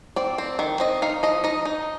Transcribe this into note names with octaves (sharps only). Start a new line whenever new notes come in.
C4 D5
C4
D#3
C4 D#5
D#4 F5
F3 D#5
D#4 D#5
D#4